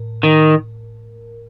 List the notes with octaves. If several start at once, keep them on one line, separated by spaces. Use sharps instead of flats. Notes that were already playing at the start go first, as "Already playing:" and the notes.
Already playing: A2 A#4
D#3